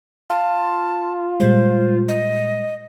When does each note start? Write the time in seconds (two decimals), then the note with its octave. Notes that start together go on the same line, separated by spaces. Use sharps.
0.30 F4 A5
1.40 A#2 G3 G#3 C5
2.08 D#5